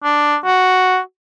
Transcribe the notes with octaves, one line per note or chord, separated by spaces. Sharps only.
D4
F#4